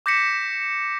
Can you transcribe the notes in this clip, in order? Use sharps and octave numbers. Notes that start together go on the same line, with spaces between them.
D6 G6 A#6 B6 C#7 E7